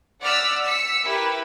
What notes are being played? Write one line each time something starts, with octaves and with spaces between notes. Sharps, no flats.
D5 F#5 E6 F6 B6
E6 B6 C#7
E4 G4 A#4 B4